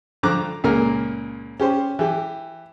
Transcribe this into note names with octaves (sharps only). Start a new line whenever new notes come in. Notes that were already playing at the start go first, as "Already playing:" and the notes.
G2 D3 F3 A#5 D6 F#6
C#2 A#2 A#3 A#4 F6
C#4 G4 C5
E3 G4